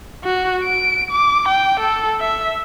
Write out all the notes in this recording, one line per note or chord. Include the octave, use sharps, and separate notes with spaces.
F#4
D7
D6
G5
A4
E5